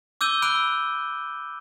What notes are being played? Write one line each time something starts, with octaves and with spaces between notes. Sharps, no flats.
D6 E6 G6 D#7 G7
B5 E6 F#6 D7 G7